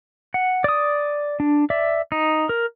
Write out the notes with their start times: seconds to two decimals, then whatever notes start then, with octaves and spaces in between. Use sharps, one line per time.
0.34 F#5
0.64 D5 D#6
1.40 D4
1.70 D5 E5
2.12 D#4
2.49 A#4